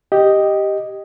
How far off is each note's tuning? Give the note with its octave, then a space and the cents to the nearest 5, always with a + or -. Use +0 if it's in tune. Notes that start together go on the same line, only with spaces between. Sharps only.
G4 +0 D#5 +0